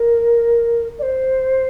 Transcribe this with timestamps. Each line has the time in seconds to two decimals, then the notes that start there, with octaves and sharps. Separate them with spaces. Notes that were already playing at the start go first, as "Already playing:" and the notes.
Already playing: A#4
0.99 D5
1.02 C5